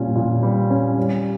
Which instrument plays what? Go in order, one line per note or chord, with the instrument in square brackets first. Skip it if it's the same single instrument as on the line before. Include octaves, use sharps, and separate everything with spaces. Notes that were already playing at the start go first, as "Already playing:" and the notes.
Already playing: [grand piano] A#2 G3 C#4
A#2
G3
C#4
G3